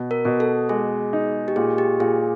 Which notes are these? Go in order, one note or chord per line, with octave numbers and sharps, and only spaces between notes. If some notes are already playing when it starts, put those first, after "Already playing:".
Already playing: B2
A#4
B2
A4
G#3 G#4
D#4
G4
A#2 G#4
G4
A#2 G#4